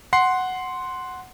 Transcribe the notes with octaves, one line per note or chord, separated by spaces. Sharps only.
F#5 C6 C7